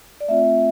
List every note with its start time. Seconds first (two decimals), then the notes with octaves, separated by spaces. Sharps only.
0.20 D5
0.28 A3 C4 F4 E5